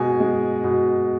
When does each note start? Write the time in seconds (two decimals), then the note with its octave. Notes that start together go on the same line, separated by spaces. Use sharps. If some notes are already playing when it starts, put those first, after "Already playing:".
Already playing: B2 G#3 G#5
0.20 G#3
0.64 B2